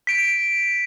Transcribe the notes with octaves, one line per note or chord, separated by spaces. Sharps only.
B6 D7